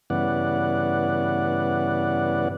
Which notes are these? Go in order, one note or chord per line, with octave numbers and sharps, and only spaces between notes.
G2 C#3 E3 B3 D5 F#5